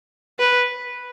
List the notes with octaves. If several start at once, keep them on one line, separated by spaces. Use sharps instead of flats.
B4